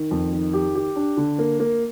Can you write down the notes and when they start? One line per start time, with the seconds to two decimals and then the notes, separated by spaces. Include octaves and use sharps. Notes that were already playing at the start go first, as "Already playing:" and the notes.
Already playing: D#3
0.11 F2
0.33 D#3
0.53 G4
0.75 G4
0.96 D4
1.17 D3
1.39 A#3
1.59 A#3